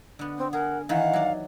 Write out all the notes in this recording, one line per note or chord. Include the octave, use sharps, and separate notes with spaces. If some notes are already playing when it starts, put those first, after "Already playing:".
D3 B3
C4
G#4 A#4 F#5
D#3 E3 F5 F#5
F#3 D5